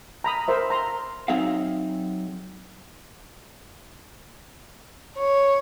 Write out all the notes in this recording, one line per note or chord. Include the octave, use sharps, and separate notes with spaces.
A#5 B5 D#6
A#4 C5 E5
A#5 C6
F#3 C4 D#4 G#4 E5 F5
C#5